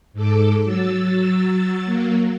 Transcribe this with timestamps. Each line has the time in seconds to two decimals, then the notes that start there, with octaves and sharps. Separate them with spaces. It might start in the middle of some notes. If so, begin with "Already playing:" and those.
0.13 G#2 A4 D6
0.64 F#3 E6 A6
1.85 F#3 A#3